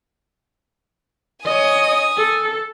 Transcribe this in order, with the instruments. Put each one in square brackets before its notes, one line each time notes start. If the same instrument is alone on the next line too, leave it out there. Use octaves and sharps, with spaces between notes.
[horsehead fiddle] C#5 D#5 [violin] G#5 D#6
[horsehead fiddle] A4